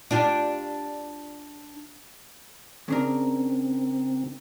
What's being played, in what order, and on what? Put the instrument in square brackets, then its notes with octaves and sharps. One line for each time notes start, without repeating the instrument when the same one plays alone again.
[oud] D4 F4 G4
[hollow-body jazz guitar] C#3 D4 A#4 [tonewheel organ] C4